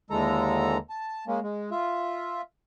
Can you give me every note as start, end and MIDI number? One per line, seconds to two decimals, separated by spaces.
0.10 0.77 39
0.10 0.77 50
0.10 0.77 52
0.10 0.77 56
0.10 0.77 69
0.10 0.77 82
0.90 1.25 81
1.27 1.40 56
1.27 1.40 58
1.27 1.40 61
1.43 1.70 56
1.71 2.41 65
1.71 2.41 76